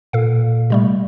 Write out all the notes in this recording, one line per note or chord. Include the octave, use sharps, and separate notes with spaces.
A#2 A4 F5
C3 G3 A3